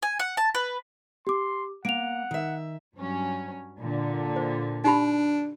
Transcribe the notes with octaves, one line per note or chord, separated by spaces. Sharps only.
G#5
F#5
A5
B4
G4 C6 D6
A#3 F#5 D7 F7
D#3 E5
G2 F#3 C#4
A#2 D3
C5
D4 D#4 G4 B5